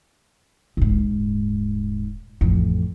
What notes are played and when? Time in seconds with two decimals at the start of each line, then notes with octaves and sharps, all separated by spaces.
0.77 D#1 G#2
2.41 A1 F2